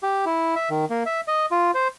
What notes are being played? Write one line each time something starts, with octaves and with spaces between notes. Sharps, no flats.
G4
E4
E5
D#3
A#3
E5
D#5
F4
C5